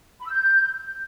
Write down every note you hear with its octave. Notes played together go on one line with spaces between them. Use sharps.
B5
E6
G6